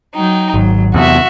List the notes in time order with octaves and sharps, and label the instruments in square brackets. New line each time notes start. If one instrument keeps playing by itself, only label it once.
[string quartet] F#3 D#4 G5
[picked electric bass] G#1 [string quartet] F#3
[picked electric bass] E2 C3 [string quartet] F#4 E5